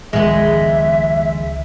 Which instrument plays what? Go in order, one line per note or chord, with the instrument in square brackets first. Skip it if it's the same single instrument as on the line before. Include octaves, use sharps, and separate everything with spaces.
[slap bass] C#2 D#3 F3 [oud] G#3 B3 [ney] E5